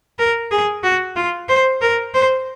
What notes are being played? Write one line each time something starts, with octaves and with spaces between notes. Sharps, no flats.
A#4
G#4
F#4
F4
C5
A#4
C5